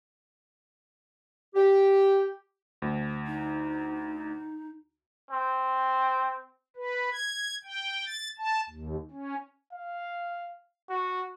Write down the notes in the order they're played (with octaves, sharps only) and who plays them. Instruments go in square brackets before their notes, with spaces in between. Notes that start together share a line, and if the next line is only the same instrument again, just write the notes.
[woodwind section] G4
[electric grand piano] D2
[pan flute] D#4
[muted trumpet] C4
[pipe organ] B4
G#6
G5
A6
A5
D#2
C#4
[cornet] F5
F#4